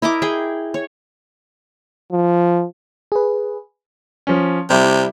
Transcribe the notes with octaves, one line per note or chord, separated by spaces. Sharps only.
E4 A#4 D#5 D6
G#4 G5
C#5
F3
G#4 B4
F3 C#4
C3 G3 E4